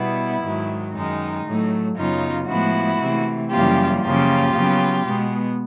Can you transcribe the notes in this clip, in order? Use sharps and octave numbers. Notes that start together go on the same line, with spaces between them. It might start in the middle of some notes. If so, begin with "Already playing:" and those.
Already playing: B2 G3 B3 E4
G#2 D#3 F#3
F#2 D#3 G#3 D#4
A2 F#3 A3
F#2 C#3 F#3 B3 D#4 F4
A2 F3 G#3 B3 E4 F#4
C3 E3 A3
F#2 C#3 E3 G3 A#3 F4 G4
F#2 C#3 F3 A#3 F4 G4
C#3 F#3 B3
B2 G#3 B3